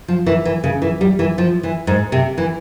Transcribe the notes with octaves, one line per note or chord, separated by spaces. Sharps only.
F3
E3
E3
C#3
E3
G3
E3
F3
E3
G#2
C3
E3